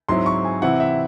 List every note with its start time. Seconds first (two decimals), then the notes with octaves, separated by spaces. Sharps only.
0.09 G#2 F#3 C4 E4 C6
0.26 C#6
0.45 G#5
0.62 C3 E3 C4 E4 F#5
0.80 E5